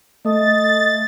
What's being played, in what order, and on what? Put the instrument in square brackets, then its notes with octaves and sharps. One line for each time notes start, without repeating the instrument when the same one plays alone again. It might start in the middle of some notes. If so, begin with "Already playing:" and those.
[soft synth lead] A3 [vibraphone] D#5 D#6 [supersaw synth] A6